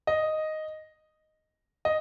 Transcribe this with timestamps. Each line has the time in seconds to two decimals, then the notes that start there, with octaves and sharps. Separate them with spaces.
0.07 D#5
1.85 D#5